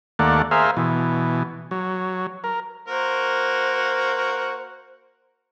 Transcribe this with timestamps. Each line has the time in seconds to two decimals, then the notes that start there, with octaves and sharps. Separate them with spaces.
0.19 D#2 A3 A#3 D5 F#5
0.51 G#4 A#4 C5 E5 F5
0.77 B2 E3
1.71 F#3
2.44 A#4
2.88 A#3 F#4 A#4 C5